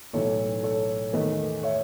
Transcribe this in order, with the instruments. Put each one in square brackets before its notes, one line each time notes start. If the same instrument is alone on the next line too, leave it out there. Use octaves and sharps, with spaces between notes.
[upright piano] B1 A2 E3 [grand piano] A4 C#5
[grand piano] A4 C#5
[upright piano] E2 D#3 A3 [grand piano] B4 D#5
[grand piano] C#5 E5